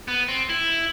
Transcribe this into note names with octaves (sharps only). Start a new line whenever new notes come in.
B3
C4
E4